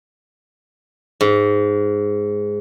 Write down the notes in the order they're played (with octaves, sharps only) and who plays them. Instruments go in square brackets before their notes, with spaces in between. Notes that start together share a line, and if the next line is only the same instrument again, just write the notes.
[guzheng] G#2